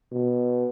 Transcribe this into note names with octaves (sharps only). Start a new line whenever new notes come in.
B2